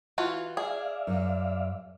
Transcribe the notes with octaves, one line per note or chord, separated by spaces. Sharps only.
E3 F4 F#4
G#4 D5 E5 F5
F#2